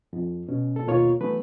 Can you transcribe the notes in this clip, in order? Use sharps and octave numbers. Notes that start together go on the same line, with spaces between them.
F2
B2 C#4
A#2 A4
D#2 B2 A#3 F4 A#4 C#5
E3 F#3 A3 B3 B4